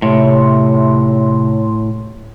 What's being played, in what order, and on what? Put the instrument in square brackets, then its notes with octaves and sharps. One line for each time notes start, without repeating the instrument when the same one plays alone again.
[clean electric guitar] A2 [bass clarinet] C3 [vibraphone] C#5 C6